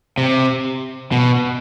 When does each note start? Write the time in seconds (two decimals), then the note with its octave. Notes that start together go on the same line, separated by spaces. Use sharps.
0.18 C3
1.12 B2